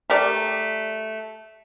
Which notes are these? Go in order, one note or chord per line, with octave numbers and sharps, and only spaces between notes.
A3 G4 A#4 D5